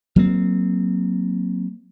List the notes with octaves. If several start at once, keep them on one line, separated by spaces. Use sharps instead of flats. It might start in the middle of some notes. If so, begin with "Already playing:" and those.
F#3 A#3 C4